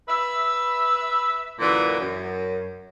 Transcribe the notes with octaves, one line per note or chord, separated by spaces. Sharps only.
B4 E5
F#2 A#2 D3 E3
F#2